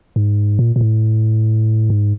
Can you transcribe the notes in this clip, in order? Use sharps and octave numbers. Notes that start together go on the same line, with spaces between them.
G#2
A#2
A#2
A2
G#2